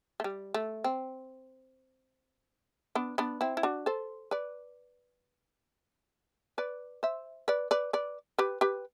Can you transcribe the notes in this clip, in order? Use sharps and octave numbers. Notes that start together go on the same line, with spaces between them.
A3
G3
A3
C4
B3 D4
B3 D4
C4 E4
E4
D4 F#4
A4 C5
B4 D5
B4 D5
C5 E5
B4 D5
B4 D5
B4 D5
G4 B4
G4 B4